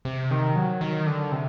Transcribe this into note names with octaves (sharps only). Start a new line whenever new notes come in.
C3
D#3
F#3
D#3
D3
C3